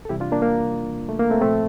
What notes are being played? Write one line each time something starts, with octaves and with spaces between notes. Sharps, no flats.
A4
C3 E3 G3 E4 G4
D4 F4
A#3 D4
A#3
A3
A#3
A3 C4
A#2 F3 A3 C4